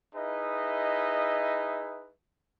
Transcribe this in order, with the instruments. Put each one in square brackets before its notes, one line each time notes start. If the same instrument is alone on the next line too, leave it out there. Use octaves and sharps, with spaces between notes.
[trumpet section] D#4 E4 G#4 B4 D#5 E5